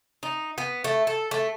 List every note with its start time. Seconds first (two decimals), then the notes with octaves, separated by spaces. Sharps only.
0.23 D#4
0.58 B3
0.84 A3
1.07 A4
1.31 A3